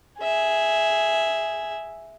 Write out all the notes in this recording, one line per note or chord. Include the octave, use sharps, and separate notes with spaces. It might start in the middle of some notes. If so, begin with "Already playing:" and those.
G#4 E5